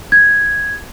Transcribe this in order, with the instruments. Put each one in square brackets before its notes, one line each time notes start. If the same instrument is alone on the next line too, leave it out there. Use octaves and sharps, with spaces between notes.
[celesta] G#6